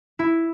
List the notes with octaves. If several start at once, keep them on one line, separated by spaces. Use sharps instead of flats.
E4